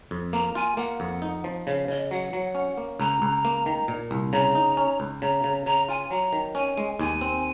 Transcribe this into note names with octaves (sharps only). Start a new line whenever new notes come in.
F2
A#3 A#5
F4 G#5
A#3 F#5
F2
D#4
F3
C#3 F5
C#3 D#5
F#3 F#5
F#3
C#4
A#3
C#2 A#5
C#2
A#3
D#3
A#2
C2
C#3 A#5
D#4
C#4
C#2
C#3 A#5
C#3
C#3 A#5
F4 G#5
F#3 A#5
D#3
C#4 G#5
G#3
D#2 G#5
C4